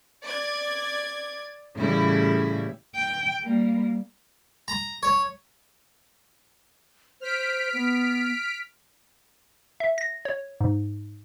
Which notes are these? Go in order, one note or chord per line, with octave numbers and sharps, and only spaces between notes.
D5 G#6
A2 C#3 E3 G3 E4
G5
G3 A#3
A#5
C#5
C5 F6 B6 D7
B3
E5
A#6
C#5
G#2